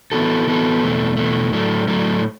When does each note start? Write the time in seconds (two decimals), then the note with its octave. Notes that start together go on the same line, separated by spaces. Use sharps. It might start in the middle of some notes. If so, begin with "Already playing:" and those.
0.12 E3 B3 F#4 A4
0.47 E3 B3 F#4 A4
0.82 E2 B2 A3
1.17 E2 B2 A3
1.53 A2 F#3 A3
1.88 A2 F#3 A3